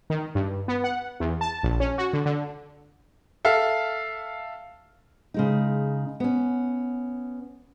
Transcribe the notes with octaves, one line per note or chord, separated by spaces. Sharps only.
D#3
G2
B3
F#5
E2
A5
A#1
C#4
F#4
D3
D3
A4 E5 F5
C#3 G#3 D#4
B3 C#4